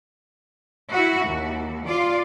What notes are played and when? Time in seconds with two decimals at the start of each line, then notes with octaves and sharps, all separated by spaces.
0.92 E4 F#4
1.26 D#2
1.88 F4 D5